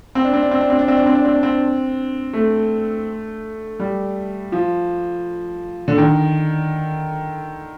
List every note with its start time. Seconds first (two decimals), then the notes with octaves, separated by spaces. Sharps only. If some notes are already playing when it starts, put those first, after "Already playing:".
0.15 C4
0.25 D4
0.34 C4
0.42 D4
0.51 C4
0.61 D4
0.70 C4
0.79 D4
0.88 C4
0.97 D4
1.06 C4
1.15 D4
1.25 C4
1.34 D4
1.43 C4
2.33 A3
3.80 G3
4.52 F3
5.88 D3
5.98 D#3